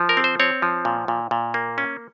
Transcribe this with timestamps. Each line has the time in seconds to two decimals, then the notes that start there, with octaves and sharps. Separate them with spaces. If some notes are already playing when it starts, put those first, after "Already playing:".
Already playing: F3
0.09 A#4
0.17 C4
0.24 C5
0.40 C4 C#5
0.62 F3
0.85 A#2
1.08 A#2
1.31 A#2
1.54 A#3
1.78 C#4